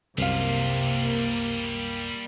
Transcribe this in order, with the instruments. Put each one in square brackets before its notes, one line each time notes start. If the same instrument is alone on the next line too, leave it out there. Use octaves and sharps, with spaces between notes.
[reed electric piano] C2 F#2 F5 [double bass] C3 [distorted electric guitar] G3 F4 [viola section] A#3